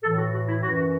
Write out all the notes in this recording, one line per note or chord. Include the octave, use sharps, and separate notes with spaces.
A2 E3 A4
F#4
F#4
E4
F#2 E3 F#4
F#4